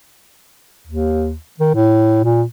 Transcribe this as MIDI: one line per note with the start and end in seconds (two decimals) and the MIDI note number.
0.87 1.34 39
1.60 1.71 51
1.75 2.23 45
2.24 2.43 46